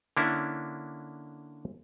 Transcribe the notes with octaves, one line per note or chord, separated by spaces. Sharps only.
D3 A#3 C#4 D4 E4